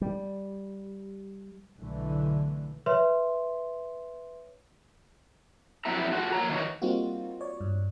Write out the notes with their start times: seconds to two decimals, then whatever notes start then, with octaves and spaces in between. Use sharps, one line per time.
0.01 G3
1.78 B1 D3 E3 A3
2.86 B4 C#5 E5 C6
5.85 F2 F#3 B3 E4 E5 A#5
6.12 F4 F#4 A4 F#5
6.32 A#3 C#5 A#5
6.49 D#3 E3 F#3 D#4 C#5
6.82 G3 A#3 C4 D#4 F4 F#4
7.41 C#5 D5
7.61 G2